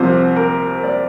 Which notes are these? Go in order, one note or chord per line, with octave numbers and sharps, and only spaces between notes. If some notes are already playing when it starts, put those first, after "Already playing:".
Already playing: C2 C3 F3 C5
A#4
D5